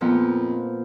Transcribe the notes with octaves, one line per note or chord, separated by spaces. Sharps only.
F2 A#2 F3 B3